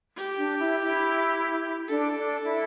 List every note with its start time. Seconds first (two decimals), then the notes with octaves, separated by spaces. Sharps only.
0.17 G4
0.39 D4
0.60 E4
0.81 E4
1.88 D4 A4
2.17 D4
2.45 E4